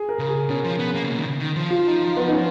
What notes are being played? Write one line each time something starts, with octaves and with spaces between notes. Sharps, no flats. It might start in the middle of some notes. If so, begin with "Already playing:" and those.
Already playing: G#4
A#4
C#3
G#4
B2 C#4
F3
B3
A#3
C#3
B2
D#3
C#3
D#3
F3
F4
D#4
B3
D#4
C#4